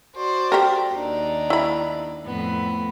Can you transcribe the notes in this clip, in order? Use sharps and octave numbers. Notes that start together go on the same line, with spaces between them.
F#4 C5 D5
G4 A4 A#4
D#2 D4 D#4
E4 B5
F2 A2 B3